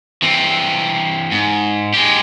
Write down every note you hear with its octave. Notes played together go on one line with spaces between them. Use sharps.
E3 C4
G#2
G#3 G4